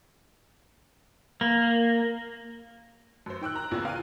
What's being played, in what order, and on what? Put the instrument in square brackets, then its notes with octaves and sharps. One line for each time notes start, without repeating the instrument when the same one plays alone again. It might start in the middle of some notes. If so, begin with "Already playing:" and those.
[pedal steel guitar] A#3
[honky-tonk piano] F#2 C5
D#3 G5 E6 F#6
A#5 F#6
A#1 E2 A2 C#3 F4
F5 G5 F6 D#7